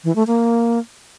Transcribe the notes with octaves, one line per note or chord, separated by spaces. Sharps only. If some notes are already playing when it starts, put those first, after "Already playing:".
E3
A3
A#3